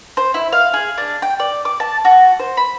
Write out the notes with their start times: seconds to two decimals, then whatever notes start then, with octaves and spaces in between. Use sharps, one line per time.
0.17 C5
0.34 E4
0.52 F5
0.74 G#4
0.98 D4
1.22 G5
1.40 D5
1.65 D6
1.80 A5
2.05 F#4
2.39 C5
2.57 B5